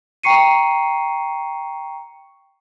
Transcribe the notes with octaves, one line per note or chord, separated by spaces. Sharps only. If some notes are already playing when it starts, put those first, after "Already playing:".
G5 A#5 C#6 C7 C#7 D#7